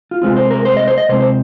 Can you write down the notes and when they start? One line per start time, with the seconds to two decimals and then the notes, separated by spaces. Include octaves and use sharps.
0.11 F4
0.22 C3 G#3 C4 F4
0.36 C5
0.51 A#4
0.65 C5
0.77 D#5
0.88 C5
0.98 D#5
1.09 C3 G#3 C4 C5
1.20 C5